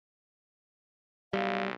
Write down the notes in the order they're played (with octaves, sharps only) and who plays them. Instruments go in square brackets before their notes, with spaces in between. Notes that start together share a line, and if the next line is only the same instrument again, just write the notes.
[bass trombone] B1 [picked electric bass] G3 [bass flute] F5